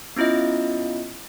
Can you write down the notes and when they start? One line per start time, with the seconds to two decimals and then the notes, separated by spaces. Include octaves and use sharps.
0.16 B3 C#4 E4 F4 D#5